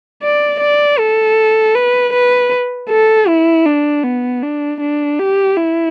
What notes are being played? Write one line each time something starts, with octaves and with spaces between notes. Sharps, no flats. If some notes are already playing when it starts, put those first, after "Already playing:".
D5
D5
A4
B4
B4
A4
E4
D4
B3
D4
D4
G4
E4